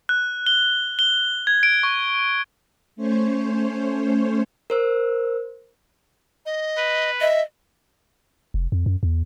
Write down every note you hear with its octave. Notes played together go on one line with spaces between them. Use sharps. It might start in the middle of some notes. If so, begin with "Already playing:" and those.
F#6
G7
G7
G#6
D7
C#6
A3 C#4 C5 C#5
A#4 C5 E6
D#5
B4
D#5 E5
F1
F2
F#2
E2